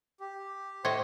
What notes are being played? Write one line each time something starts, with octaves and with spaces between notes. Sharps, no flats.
G4
A2 C5 C#5 D#5